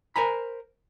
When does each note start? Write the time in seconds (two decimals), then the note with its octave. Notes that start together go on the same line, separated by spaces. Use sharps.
0.16 A#4 C5 G#5 A#5 B5